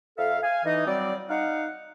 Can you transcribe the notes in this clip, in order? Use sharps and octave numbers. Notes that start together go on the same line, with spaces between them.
F2 A4 E5 F5
F5 G#5
E3 D#4 D#5
F#3 G3 C4 D5
D#4 F5 F#5